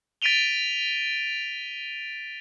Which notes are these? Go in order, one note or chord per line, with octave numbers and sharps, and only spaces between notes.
A6 B6 D7 D#7 F7 G7